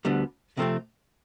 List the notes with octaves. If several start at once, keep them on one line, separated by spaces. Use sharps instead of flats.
D2 D3 G3 B3
C3 F3 A3 C4